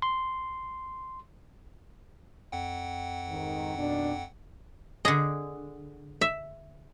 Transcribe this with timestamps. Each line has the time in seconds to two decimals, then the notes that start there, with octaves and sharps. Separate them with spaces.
0.02 C6
2.52 F2 F#5 G5
3.28 G#2 D#3
3.77 B2 D#3 D4
5.05 D3 G#4 D#5
6.21 E5